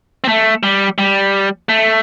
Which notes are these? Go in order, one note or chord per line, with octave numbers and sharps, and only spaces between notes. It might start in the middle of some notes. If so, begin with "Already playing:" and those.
C4
A3
G3
G3
A3